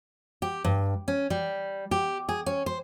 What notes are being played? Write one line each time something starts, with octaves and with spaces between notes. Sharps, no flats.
G4
G2
C#4
G3
G4
G#4
C#4
C5